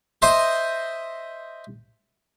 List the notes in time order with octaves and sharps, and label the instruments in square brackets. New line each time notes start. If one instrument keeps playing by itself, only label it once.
[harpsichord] C5 D#5 E5 C6